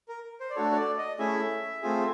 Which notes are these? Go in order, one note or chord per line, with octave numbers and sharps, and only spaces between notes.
A#4
C5
D5
A3 D4 F#4 A4 C#5
C#5
D5
D#5
A3 C#4 E4 G#4 E5
A3 C4 F4 G#4